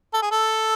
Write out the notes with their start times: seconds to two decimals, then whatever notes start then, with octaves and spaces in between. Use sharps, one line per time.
0.14 A4
0.22 G#4
0.31 A4